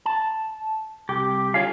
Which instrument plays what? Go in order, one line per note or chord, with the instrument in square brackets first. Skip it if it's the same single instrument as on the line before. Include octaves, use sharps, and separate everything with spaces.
[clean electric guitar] A5
[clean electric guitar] C2 [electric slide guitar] G4
[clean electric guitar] D3 F4 G#4 [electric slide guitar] C#5 F5